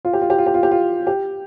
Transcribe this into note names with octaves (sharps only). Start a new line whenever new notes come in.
F4
G4
F4
G4
F4
G4
F4
G4
F4
G4